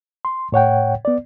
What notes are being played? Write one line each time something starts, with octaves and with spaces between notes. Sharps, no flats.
C6
A2 C#5 F#5 G5
B3 D5